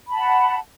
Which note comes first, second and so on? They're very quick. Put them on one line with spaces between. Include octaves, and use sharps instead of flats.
B5 A5 F#5